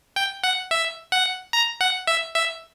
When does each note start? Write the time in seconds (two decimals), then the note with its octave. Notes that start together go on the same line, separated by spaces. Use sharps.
0.16 G5
0.44 F#5
0.71 E5
1.12 F#5
1.53 A#5
1.81 F#5
2.07 E5
2.35 E5